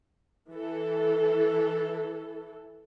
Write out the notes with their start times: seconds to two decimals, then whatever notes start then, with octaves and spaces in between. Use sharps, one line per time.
0.52 E3 A4